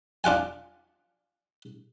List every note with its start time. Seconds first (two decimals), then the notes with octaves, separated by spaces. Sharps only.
0.24 D4 F4 F#5 G#5